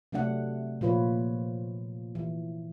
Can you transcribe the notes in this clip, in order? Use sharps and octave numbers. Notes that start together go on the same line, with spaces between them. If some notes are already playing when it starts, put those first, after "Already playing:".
C3 F#3 A3 D4 F#5
A#2 F3 F4 B4 C#5
E3